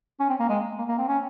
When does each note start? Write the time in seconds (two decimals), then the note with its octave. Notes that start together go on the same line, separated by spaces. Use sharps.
0.20 C#4
0.29 C4
0.39 A#3
0.49 G#3
0.78 A#3
0.89 A#3
0.98 C4
1.08 C#4